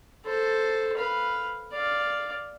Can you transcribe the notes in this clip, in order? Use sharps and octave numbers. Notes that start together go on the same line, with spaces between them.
A4 C5
B4 F5
D5 F5